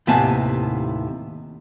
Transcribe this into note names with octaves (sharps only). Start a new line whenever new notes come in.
D#2 A2 C3 B3 G#5 A5